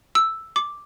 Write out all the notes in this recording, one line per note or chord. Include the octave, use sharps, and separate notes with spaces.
E6
D6